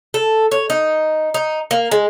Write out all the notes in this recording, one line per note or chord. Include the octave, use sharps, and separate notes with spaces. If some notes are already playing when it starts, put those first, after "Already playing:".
A4
C#5
D#4
D#4
A#3
G#3